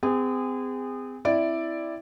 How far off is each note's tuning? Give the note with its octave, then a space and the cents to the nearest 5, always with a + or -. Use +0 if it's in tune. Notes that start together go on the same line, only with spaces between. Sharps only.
C4 -40 G#4 -25
C4 -5 E4 +0 D5 +0